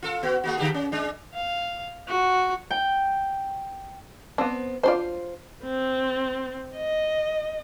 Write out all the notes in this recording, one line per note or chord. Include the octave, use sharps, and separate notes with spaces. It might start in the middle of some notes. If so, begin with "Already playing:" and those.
F4 A4
B3 F#4
G#3 A#3 F#4
D3 G4 G#4
C#4
G#3 D4
F5
F#4
G5
B3 C4 D4
F#3 D4 F4 C5 D5
C4
D#5